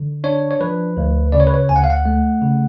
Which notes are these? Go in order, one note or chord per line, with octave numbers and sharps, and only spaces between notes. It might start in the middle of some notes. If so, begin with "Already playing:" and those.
Already playing: D3
D4 C#5
C#5
F3 B4
D2
C#3 D5
C#5
B4
C#5
D2 G#5
F#5
F5
F#5
A3
C#3